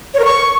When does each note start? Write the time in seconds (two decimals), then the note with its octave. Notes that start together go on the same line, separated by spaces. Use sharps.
0.14 C#5
0.19 A#4
0.25 C#6